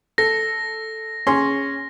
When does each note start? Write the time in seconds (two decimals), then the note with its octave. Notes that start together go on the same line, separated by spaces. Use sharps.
0.18 A4 A#6
1.27 C#4 G#4 C6